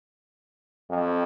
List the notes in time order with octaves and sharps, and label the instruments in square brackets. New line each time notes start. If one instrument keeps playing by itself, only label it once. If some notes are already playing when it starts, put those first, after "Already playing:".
[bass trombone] F2